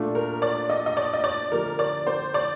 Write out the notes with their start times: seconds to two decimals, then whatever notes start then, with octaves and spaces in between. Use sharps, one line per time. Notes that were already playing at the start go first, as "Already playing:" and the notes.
Already playing: A#2 A3 D4 F4
0.15 A#4
0.42 D5
0.70 D#5
0.86 D#5
0.97 D5
1.13 D#5
1.24 D5
1.51 D3 F3 A3 D4 G4 A#4
1.79 D5
2.07 C5
2.34 D5